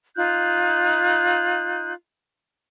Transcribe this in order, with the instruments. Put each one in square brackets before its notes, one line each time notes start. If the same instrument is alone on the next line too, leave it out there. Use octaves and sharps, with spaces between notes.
[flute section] D#4 F4 F#6 G6